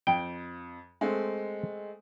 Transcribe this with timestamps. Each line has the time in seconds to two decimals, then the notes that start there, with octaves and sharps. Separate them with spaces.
0.07 F2 G5
1.01 G#3 A3 C4